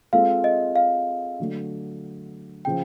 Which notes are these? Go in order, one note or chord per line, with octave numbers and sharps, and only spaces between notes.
G#3 C4 F4 A4 F5
D#5
F5
D3 F#3 A3
C#3 F3 G5